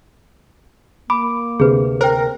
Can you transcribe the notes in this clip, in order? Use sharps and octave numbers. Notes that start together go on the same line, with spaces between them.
A#3 B5 D6
D2 C3 G#4 B4
A#4 C5 G5